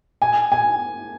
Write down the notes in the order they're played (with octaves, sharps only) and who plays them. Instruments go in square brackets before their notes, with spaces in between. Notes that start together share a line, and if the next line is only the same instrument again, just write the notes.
[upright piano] G#5
G#5